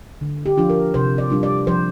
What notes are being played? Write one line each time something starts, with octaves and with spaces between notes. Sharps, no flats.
D3
G4
F3 D4 F4
A#4
C3 C5
D5
G3 D4 F4
D5
F3 C5